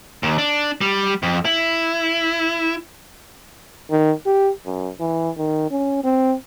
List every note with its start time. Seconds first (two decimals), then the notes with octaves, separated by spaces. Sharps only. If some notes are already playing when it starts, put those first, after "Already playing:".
0.23 D#2
0.38 D4
0.81 G3
1.23 F2
1.45 E4
3.91 D#3
4.26 G4
4.66 F#2
5.00 E3
5.37 D#3
5.71 C#4
6.03 C4